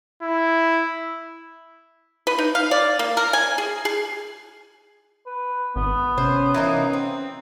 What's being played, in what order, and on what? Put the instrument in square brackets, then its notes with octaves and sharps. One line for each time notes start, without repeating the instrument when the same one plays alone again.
[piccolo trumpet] E4
[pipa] B4
D#4
F5
D5
A#3
A#4
G#5
G#4
G#4
[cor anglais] B4
[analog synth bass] G#1 [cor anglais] B3
[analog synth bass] C3 [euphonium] C#4 [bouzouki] C5
[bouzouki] E3 A#3 D#4
C4